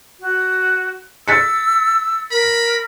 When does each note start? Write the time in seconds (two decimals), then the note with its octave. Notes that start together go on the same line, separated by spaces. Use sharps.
0.20 F#4
1.28 E6 A6 B6 C#7
2.31 A#4 B5